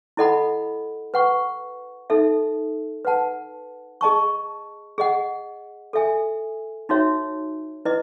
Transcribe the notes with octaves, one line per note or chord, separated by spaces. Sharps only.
E4 A4 D#5 F#5 B5
B4 F#5 C#6
D#4 A4 E5
B4 F#5 A5
G#4 D#5 A5 C#6
G#4 D#5 F#5
A4 E5 G#5
D#4 F#4 C#5 E5
E4 B4 D#5